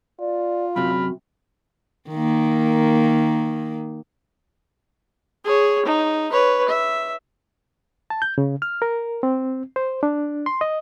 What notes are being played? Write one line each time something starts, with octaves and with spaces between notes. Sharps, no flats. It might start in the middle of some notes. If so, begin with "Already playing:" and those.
F4 D5
F#2 C3 F#4 B5 F6
D#3 A#3
G#4 C#5
D#4
B4 C#5
E5
A5
G6
C#3
F6
A#4
C4
C5
D4
C6
D#5